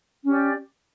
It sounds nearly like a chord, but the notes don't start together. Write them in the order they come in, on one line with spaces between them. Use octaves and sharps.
C#4 G4 D5